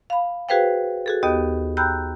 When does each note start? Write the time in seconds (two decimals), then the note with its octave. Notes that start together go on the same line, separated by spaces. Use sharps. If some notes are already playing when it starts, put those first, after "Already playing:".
0.10 F5 B5
0.49 F#4 G#4 B4 C5 F5 G5
1.06 F#4 G#4 A4
1.23 D#2 B3 G4 D#5 D#6
1.77 G5 A#5 B5 E6 F#6 G6